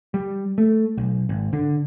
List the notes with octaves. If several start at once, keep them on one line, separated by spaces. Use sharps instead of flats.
G3
A3
B1
G#1
D3